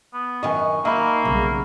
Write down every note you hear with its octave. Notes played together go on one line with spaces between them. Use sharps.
B3
F#2 D#3 D#5 G#5 C#6
A#3 D#4 E5 B5
B1 C#3 F#3 G3